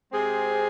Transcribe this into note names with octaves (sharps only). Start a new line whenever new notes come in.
C3 G#3 C4 G#4